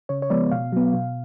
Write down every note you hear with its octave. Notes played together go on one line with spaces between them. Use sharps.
C#3 C#5
C#5
F3 G#3 B3 D5
B2 F5
F#3 B3
B2